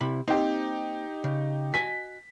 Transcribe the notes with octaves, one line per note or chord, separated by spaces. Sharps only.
C3 E4 B5
A#3 C4 D#4 G4 C5
C#3
F#4 D#5 G#5 B6